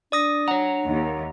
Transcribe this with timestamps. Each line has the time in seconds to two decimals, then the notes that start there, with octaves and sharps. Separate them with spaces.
0.12 D4 D5 D#6 A#6
0.48 C#5 F#5 A#5
0.87 D#2